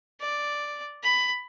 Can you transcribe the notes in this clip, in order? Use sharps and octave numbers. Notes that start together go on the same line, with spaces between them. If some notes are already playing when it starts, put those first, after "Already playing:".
D5
B5